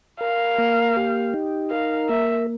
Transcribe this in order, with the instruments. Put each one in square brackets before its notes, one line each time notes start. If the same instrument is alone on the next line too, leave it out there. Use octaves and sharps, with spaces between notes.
[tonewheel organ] A#4 [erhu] F5
[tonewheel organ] A#3
G4
D#4
[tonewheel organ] A#4 [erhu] F5
[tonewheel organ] A#3 [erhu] E5